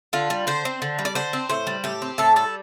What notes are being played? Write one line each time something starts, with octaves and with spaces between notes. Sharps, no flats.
D3 F4
G3
D3 C5
C4
D3
G3
D5
D3 C5
C4
A2 C5
G3
A2 G4
C4
A2 A4
G3 A4